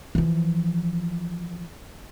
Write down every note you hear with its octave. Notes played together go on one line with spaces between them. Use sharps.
E3 F3